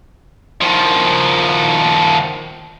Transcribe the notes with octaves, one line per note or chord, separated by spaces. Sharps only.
D#3 F3